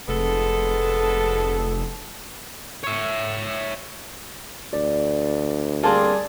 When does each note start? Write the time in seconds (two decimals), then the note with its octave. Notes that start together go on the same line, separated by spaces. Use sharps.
0.08 F1 G#3 B3 A4
2.83 C#5 E5
4.73 D2 D5
5.83 G3 A#3 C4 D4 G#4 A5